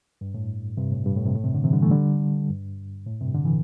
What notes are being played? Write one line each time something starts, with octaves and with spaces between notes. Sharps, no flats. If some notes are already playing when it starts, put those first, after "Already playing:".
G2
A2
G2 C3
A2
G2
A2
G2 C3
A2
G2 C3
A2 D3
C3 E3
D3 G3
E3 A3
D3 G3
G2
A2
G2 C3
D3
E3